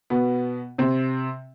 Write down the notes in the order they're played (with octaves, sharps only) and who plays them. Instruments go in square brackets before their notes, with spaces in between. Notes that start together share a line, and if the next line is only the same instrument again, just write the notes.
[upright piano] B2 B3
C3 C4